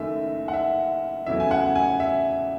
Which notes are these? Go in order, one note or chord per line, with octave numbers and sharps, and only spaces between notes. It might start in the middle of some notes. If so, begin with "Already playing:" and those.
Already playing: F#1 F#2 D#3 A3 E5
F#5
E5
E2 C#3 F#3 A3 E4 E5
G#5
F#5
G#5
E5